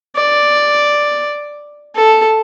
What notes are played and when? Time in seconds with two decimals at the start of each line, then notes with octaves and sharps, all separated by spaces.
0.17 D5
1.96 A4